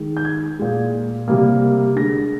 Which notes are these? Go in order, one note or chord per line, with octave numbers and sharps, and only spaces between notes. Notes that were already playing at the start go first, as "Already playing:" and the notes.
Already playing: D#3 G#3
G6
G#6
A#2 G#3
C3 G3 A#3
D3 G#3 A#6